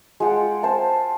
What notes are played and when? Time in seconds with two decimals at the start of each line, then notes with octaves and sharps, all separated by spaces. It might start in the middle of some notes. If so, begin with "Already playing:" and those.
0.20 G#3 F4 F#5 G5
0.63 C5 F5 A5